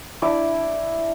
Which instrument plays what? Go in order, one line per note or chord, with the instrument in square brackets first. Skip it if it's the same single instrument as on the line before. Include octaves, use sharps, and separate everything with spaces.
[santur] D4 E4 D6